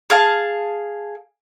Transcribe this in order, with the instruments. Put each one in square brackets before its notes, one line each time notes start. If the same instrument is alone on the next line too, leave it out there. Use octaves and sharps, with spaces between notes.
[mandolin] G#4 F5 A5